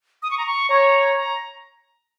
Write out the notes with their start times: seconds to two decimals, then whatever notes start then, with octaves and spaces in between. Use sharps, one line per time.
0.23 D#6
0.31 C#6
0.38 A#5
0.46 C#6
0.69 C#5 A#5
1.17 A#5